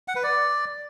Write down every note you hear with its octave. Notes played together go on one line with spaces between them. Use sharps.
F#5
B4
D5